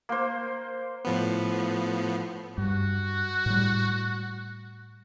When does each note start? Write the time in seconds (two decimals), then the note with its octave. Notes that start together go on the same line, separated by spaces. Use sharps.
0.09 A#3 C5
1.05 A2 F3 B3
2.58 G2 F#4
3.46 A2 G3